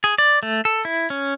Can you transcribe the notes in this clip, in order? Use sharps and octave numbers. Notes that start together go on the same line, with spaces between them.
G#4
D5
A3
A4
E4
C#4